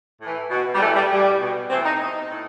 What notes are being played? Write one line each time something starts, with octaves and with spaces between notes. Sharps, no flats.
A2 E3
B2
G3
A2 E3 A3
G3
A2 E3 G3
B2
A2 E3 C4
D#4
B2 D#4
A2